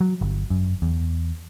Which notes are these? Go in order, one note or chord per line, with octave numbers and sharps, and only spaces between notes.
F#3
G1
F#2
E2